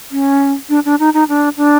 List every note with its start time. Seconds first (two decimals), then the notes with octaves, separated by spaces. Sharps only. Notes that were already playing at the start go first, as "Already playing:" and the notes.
0.11 C#4
0.69 D4
0.85 D4
0.99 D#4
1.13 D#4
1.28 D4
1.57 D4